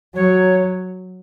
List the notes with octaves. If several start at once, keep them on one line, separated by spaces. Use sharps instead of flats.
F#3 C#5